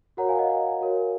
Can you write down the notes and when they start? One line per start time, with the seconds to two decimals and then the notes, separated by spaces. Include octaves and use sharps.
0.17 F#4 A#4 C#5 F#5 A#5
0.28 F5 G#5
0.39 D#5 F#5
0.49 D#5 F#5
0.65 F5 G#5
0.81 F#4 A#4 C#5